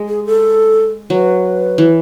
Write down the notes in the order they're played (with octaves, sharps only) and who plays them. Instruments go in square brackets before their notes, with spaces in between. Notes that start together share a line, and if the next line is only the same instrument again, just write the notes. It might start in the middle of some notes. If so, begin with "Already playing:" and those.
Already playing: [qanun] G#3
[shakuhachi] G#4
A4
[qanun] F#3 [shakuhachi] B4
[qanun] E3